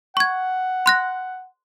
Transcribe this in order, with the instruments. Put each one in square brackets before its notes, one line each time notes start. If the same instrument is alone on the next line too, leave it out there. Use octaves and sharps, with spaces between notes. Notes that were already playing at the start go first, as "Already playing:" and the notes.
[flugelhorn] F#5 [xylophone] C#6 G#6
[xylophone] C6 F#6 A#6